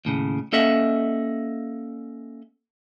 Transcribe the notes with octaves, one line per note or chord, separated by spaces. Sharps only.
D#2 A2 C#3
A#3 C#4 A4 D#5 E5 F#5